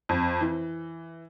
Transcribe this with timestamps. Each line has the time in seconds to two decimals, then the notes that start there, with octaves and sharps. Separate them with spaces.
0.09 F2
0.41 E3